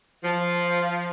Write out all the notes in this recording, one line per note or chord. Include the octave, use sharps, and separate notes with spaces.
F3